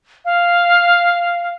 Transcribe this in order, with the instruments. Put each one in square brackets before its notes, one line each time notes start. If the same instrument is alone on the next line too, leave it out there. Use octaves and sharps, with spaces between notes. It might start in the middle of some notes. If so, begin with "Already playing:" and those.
[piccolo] F5